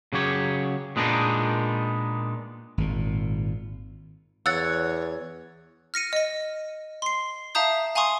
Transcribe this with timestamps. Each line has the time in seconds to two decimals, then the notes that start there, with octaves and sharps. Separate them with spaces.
0.13 C#3 F#3 G4 C#5
0.96 A#2 G#3 B3 D4 D#4
2.78 G#1 A#2
4.46 E2 C#5 F#5 E6 F#6 A6
5.94 F6 A#6 C#7 D#7
6.13 D#5 A#6
7.02 C6 C7
7.55 E5 F5 A5 A#5 D#6 G6
7.95 F5 G#5 A#5 C6 C#6 D#6